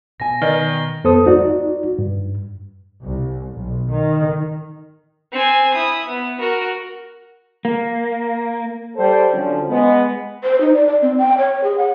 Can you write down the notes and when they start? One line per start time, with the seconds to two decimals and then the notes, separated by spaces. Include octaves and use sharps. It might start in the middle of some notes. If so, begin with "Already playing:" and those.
0.20 B2 G#5 A#6
0.42 D#3 B4 D5 D#5 G7
1.04 F2 B3 A4 C5 D#6
1.26 D#4 F#4 D5
1.99 G2
3.02 C2
3.53 B1
3.91 D#3
5.33 C4 G#5
5.74 E4 D#6
6.08 B3
6.40 F#4 A#4
7.65 A#3
8.95 G3 A4 C5
9.31 D3 F3 F#3 C#4
9.68 G#3 B3
10.44 C5
10.61 D#4
10.74 D5
10.88 D5
11.02 C4
11.18 G5
11.38 C#5
11.64 G#4
11.78 F#5